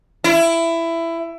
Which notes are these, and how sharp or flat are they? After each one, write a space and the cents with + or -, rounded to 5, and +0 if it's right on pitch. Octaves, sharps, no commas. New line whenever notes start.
E4 +15